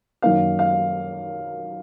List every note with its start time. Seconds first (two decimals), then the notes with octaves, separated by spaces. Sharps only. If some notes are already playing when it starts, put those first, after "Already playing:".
0.22 F#2 D#3 A#3 F5
0.59 F5